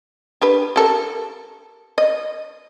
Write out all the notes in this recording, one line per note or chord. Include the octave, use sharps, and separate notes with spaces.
D4 G4 B4
G4 A4 A#4
D#5